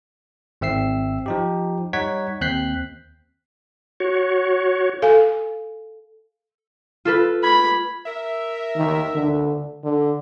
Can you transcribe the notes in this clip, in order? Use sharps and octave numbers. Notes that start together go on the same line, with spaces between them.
G#1 C4 E5 E6 C7
F3 D#4 G4
G3 D#4 C#5 F#5 G#6 B6
D#2 C4 F#6 G6 B6 C7
F#4 C#5
A4 F5 G#5
F4 A4 B4
B5 G#6
A#4 E5
D#3
D3
D3